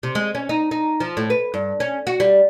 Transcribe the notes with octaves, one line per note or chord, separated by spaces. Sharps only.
C3
G#3
C#4
D#4
D#4
F3
A2
B4
G2
C#4
F#4
G3